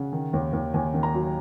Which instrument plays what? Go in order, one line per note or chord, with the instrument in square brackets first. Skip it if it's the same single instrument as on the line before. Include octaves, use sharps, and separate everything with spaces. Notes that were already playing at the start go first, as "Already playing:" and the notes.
Already playing: [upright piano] C#3 F#5
D#3
D#2
D#2
D#2 G#5
D#3
A#5
F#3